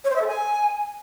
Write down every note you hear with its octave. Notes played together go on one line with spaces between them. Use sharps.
C#5
C5
E5
A4
G#5